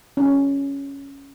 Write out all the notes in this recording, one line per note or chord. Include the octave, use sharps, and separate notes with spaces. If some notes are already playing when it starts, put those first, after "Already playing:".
C#4